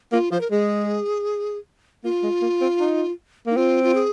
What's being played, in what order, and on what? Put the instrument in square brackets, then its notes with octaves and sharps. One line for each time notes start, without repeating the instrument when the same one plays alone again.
[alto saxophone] A#3 [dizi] F4
[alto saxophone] F3 [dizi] C5
[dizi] A#4
[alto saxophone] G#3 [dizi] G#4
[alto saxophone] A#3 [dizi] F4
[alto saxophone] G#3
A#3
C4
D#4
[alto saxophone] A#3 [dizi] D#4
[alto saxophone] C4 [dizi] F4
[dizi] F4
G#4